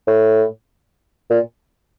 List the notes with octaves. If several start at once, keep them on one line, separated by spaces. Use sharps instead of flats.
A2
A#2